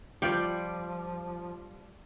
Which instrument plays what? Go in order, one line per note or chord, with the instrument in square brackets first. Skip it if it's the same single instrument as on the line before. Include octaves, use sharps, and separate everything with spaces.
[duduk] F3 [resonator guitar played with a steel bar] G3 [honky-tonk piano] F4 D6 [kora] D5 F5 G5